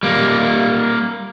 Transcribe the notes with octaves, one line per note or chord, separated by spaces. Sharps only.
G3 A#3